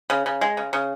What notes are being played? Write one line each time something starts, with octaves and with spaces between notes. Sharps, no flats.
C#3
C#3
G#3
C#3
C#3